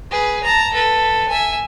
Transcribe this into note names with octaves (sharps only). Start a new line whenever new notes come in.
G#4 B4
A5 A#5
A4 B4
E5 G#5